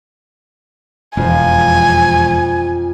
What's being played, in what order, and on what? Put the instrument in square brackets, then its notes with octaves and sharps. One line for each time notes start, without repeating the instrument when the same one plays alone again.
[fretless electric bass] E1 [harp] F2 F3 [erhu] G#5